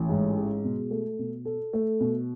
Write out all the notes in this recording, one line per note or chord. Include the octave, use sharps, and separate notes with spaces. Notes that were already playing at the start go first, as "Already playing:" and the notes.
Already playing: A1
G#2
G#3
B2
A3
B2
A4
A3
B2